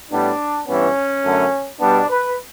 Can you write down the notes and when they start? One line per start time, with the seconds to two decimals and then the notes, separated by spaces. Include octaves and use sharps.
0.11 A2 G3 B3 D4
0.67 G2 E3 B3 C#4
1.24 F#2 D3 A3
1.79 B2 G3 B3 D4
2.09 B4